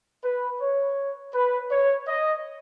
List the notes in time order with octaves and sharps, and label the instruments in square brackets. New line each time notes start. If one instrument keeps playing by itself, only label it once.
[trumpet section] B4
C#5
B4
C#5
D#5